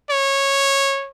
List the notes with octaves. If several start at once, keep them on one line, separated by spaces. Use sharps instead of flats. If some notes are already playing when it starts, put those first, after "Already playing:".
C#5